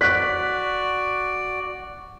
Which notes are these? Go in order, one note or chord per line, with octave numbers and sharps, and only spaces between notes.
F#4 D5 F#6 B6